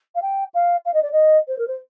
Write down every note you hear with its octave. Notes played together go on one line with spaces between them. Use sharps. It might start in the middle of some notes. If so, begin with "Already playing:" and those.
F5
G5
F5
F5
D#5
D5
D#5
C5
A#4
C5